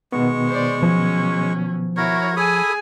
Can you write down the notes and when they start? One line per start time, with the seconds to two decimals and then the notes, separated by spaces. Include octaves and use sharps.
0.12 B2 D#3 G#3 B3 C#6
0.49 C5 D5
0.83 F3 F#3 C#4
1.97 E4 F#4 A#4 C#5
2.37 G#4 A4 G#5 B5 D#6